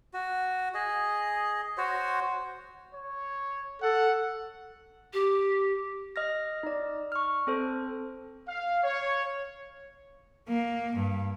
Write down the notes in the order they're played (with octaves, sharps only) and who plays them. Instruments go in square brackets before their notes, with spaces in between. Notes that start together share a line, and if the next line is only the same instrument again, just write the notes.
[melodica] F#4
G#4 D#5
F#4 C5 C#5
[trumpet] C#5
[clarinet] A4 [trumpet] F#5
[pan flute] G4
[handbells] D#5 F6 A#6
D#4 D5
C#6 F6
C4 A4 C5
[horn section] F5
C#5
[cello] A#3
G2